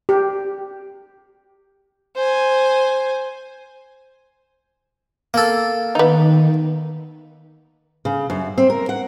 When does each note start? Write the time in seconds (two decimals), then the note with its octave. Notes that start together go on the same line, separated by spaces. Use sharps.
0.09 G4
2.15 C5 G#5
5.34 A#3 A4
5.95 D#3 B3 D#4
8.05 C#3
8.30 F#2
8.58 C4
8.70 A#4
8.89 F#5